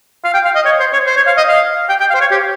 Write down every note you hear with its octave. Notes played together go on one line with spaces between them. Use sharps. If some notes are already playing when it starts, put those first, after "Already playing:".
F5
G5
F5
D#5
C#5
C5
C#5
C5
C#5
F5
D#5
F5
G5
G5
F5
C5
C#5
G4